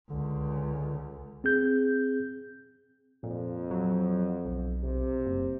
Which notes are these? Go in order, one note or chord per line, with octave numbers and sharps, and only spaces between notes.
C#2 D3
C4 G#4 G6
F2 A#2
F#3
B1
C3
F#1